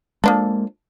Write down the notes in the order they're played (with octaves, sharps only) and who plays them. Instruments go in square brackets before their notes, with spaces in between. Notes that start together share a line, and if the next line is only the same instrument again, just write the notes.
[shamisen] F3 D4 A4 [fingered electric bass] G#3 A#3